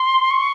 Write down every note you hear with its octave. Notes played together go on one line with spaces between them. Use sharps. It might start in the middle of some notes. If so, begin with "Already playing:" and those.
Already playing: C6
C#6